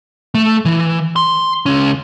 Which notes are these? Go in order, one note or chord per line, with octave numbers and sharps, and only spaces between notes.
A3
E3
C6
C#2 C#4